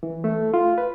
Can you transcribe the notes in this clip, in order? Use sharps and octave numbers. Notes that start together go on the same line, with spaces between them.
E3
A3
F4
B4